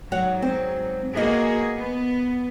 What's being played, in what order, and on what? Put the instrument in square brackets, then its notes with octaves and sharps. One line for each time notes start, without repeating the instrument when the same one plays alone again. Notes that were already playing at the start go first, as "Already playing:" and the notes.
[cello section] G#2 F#3 [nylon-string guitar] F#4 C#5 F#5
[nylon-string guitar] C4
[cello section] A#3 F#4 G#4 [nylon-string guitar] B4 D#5
[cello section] B3